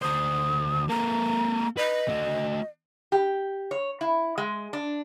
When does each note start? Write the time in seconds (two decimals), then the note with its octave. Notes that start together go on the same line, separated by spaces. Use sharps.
0.02 D2 C5 D#6
0.89 A#3 A4 A#5
1.77 B4 D#5
2.09 A3 F#4
3.12 G4
3.71 C#5
4.01 E4
4.38 G#3
4.73 D4